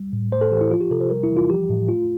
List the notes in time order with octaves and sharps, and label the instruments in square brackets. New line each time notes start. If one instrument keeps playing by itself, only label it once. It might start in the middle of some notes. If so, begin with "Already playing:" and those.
Already playing: [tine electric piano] G3
A2
A3 C5
A4
E3 G4
E4
F3 F4
G4
C3 A4
C5
G3 A#4
E4
E3
F4
F3 G4
A2
A3 F4